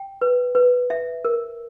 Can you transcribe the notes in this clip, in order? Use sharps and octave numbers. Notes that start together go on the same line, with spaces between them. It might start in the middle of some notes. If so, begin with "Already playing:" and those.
Already playing: G5
B4
B4
E5
A#4